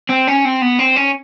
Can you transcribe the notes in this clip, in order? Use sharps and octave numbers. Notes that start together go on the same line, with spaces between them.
C4
C#4
C4
B3
C4
C#4